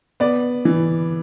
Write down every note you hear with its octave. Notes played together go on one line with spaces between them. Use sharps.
B3 D5
E3